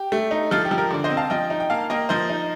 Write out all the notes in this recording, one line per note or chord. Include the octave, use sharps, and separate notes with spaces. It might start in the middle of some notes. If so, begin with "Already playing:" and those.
Already playing: G4
A3
D#4
F3 F4 A4
G4
F3
G4 A#4
D3 D5
C5 D#5
C4
F5 A5
F3 D#5 G5
D#4
G5
A#3 F5 A5
A#3 D#5 G5
F3 C5 D#5
D#4